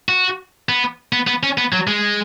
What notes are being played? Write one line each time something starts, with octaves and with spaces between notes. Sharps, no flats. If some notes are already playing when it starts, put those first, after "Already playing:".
F#4
B3
B3
B3
C#4
B3
F#3
G#3